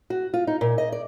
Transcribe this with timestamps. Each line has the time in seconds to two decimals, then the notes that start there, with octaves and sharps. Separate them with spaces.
0.10 F#4
0.34 F4
0.47 D#4
0.61 A#2
0.78 D#5
0.92 D5